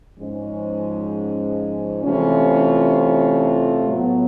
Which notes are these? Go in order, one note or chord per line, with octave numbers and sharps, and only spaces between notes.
G#2 F3 G#3 C#4
C3 E3 A3 C#4 F4
A2 F#3 B3